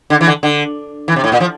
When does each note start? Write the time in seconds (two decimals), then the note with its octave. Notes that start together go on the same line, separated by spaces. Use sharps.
0.10 D3
0.21 E3
0.27 D3
0.43 D3
1.08 E3
1.16 C3
1.24 A2
1.32 A#2
1.40 F3